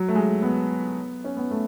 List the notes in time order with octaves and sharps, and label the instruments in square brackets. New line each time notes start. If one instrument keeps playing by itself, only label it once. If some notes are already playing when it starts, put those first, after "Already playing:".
Already playing: [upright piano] F#3
A3
G#3
B3
C#4
B3
A3